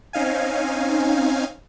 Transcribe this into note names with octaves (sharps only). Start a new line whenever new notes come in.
C4 C#4 D#4 F5 G#5